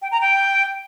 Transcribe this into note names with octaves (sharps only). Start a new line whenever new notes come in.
G5
A#5
G5